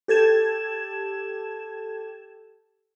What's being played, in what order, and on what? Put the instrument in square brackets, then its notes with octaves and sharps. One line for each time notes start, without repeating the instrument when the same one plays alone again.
[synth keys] G4 A4 G#6 E7